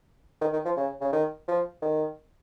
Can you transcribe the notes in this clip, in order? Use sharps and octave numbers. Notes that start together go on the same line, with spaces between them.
D#3
D#3
F3
C#3
C#3
D#3
F3
D#3